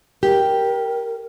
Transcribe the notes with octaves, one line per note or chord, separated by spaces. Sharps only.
G4 A#4